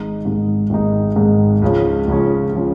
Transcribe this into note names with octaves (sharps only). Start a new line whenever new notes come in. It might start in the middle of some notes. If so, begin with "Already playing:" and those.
Already playing: G#1 G#2 G#3 D#4
G#1 G#2 G#3 D#4
G#1 G#2 G#3 D#4
G#1 G#2 G#3 D#4
C#2 C#3 F3 C#4
C#2 C#3 F3 C#4
C#3 F3 C#4